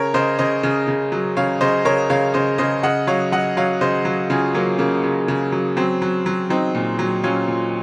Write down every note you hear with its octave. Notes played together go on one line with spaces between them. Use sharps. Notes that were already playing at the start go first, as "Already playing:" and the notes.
Already playing: C#3 A#4 C#5
C#3 C5 D#5
C#3 C5 D#5
C#3
C#3
F#3
C#3 C#5 F5
C#3 C5 D#5
C#3 A#4 C#5
C#3 C#5 F5
C#3 C5 D#5
C#3 C5 D#5
C#3 D#5 F#5
F#3 C#5 F5
F#3 D#5 F#5
F#3 C#5 F5
C#3 C5 D#5
F#3
C#3 F4 G#4
F#3 A#3 C#4
C#3 A#3
C#3
C#3
F#3
F#3 C4
F#3
F#3
F#3 C4 D#4
A#2
F#3
F#3 C#4 F4
A#2